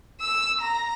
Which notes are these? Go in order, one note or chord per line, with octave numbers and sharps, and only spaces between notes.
E6
A#5